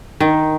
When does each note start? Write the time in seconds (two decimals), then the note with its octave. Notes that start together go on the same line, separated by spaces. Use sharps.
0.20 D#3